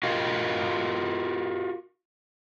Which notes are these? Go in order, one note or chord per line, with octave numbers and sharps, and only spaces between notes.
F4 F#4 A#4 D#5 F5